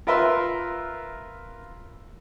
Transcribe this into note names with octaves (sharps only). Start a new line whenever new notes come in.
F4 A#4 B4 E5 C6